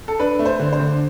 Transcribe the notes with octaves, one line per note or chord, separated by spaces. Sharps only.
A4
D4 B4
A3
C5
D3
C5
D3